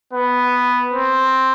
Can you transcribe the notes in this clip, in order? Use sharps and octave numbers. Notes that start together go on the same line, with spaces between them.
B3
C4